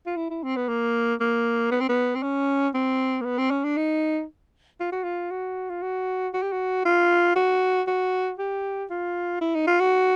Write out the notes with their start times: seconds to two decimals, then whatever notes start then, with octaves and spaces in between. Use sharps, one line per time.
0.06 F4
0.17 E4
0.30 E4
0.43 C4
0.56 B3
0.69 A#3
1.21 A#3
1.71 B3
1.81 C4
1.89 B3
2.15 C4
2.23 C#4
2.74 C4
3.21 A#3
3.25 B3
3.38 C4
3.51 C#4
3.64 D4
3.77 D#4
4.80 F4
4.92 F#4
5.04 F4
5.31 F#4
5.70 F4
5.82 F#4
6.34 F#4
6.42 G4
6.52 F#4
6.85 F4
7.36 F#4
7.88 F#4
8.39 G4
8.90 F4
9.41 E4
9.55 D#4
9.67 F4
9.80 F#4